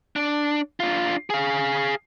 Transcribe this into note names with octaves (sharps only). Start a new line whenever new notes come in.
D4
D4 F4
G#4 F5